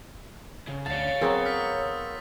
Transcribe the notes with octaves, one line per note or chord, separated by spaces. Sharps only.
C#3
D2 C#5 F5 A5 A6
F#3 B3 C4 G#4 A#4
D#6 F6 B6